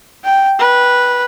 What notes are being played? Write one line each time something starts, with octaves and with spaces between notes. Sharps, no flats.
G5
B4